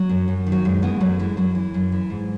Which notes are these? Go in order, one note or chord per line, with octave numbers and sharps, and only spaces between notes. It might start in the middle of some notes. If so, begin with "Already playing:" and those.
Already playing: F#3
F#2
F#2
D#3
F#3
F#2 G#3
E3 G#3 B3
F#2 F#3 A3
E3 G#3
F#2 F#3
E3
F#2
E3
G#2